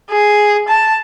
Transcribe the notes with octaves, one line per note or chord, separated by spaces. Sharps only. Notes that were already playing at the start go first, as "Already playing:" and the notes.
G#4
A5